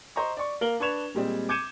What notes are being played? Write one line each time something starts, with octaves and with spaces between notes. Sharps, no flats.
C5 D#5 A#5 C#6
D5 C#6
A#3 A#4 F5 F#7 G7
D4 B4 C#6 G#6 E7 F7
A#2 G3 G#3 C4
D6 G6 G#6 C#7 D#7 E7